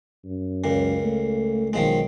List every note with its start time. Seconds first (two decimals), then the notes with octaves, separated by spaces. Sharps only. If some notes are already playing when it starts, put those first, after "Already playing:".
0.25 F#2
0.64 C#2 A#2
1.05 A3
1.73 B1 D#3 F3 G#3